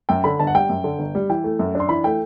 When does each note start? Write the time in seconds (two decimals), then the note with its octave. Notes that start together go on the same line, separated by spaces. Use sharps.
0.09 F#2 G5
0.24 D3 B5
0.40 G1 A5
0.47 F#5
0.54 G3 G5
0.69 F#2
0.84 D3
0.99 G1
1.15 G3
1.29 E3 G5
1.44 A3
1.59 F#2
1.75 D4
1.80 C6
1.89 E3 B5
2.04 A3 G5